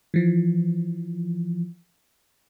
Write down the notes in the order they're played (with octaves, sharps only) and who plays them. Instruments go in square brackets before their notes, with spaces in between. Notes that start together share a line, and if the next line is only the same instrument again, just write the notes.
[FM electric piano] E3 F3